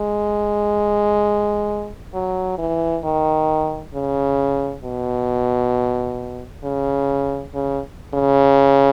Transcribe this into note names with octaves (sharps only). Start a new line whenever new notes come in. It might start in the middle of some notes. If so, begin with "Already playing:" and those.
Already playing: G#3
F#3
E3
D#3
C#3
B2
C#3
C#3
C#3